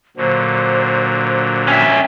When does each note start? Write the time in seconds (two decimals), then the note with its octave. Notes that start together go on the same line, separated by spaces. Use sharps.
0.17 A#2 D3 F#3 C5
1.68 C#4 E5 G5